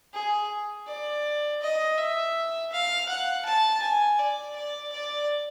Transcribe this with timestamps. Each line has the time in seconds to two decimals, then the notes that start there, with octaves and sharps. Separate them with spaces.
0.14 G#4
0.87 D5
1.62 D#5
1.98 E5
2.72 F5
3.09 F#5
3.45 A5
3.83 G#5
4.19 D5
4.56 D5
4.92 D5